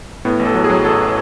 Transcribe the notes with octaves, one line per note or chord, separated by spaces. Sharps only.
A2 B3
A1
A4
F#3
G#4
F#3
A1 A4